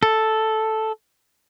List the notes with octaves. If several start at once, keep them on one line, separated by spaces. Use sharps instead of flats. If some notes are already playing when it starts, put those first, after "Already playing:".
A4